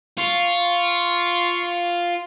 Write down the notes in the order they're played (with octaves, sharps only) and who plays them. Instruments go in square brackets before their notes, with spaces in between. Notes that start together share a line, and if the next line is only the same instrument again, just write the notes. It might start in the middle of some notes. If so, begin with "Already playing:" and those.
[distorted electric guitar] F4 [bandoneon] C6 C#6